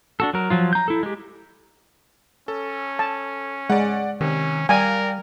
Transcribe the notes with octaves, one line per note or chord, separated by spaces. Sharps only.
D4 F#4 A4
F#3 A#4
F3 F#3 F4
A#5 G6
E4 A4
G#3 G4
C#4 A4
A5
G#3 D5 F#5
C3 D#3 C#4
G3 A#4 D5 F5 G5 G#5